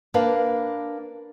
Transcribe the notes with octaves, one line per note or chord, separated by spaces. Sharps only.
A#3 D4 A#4 B4 F5